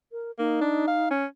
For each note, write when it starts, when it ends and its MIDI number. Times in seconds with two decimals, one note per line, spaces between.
0.12 0.31 70
0.39 0.57 58
0.39 1.10 63
0.61 0.83 62
0.87 1.06 77
1.11 1.25 61